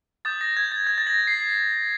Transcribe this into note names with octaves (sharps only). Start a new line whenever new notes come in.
D#6 G6 A6
A#6
G#6
A6
G#6
A6
A#6
C7